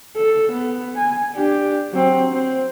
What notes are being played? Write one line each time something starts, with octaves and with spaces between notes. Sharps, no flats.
A4
B3
G#5
D4 G4
F#3 C4
C4